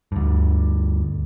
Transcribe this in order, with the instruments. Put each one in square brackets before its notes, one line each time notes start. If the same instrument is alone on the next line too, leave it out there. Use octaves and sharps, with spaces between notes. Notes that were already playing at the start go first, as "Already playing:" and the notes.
[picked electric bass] D2 G2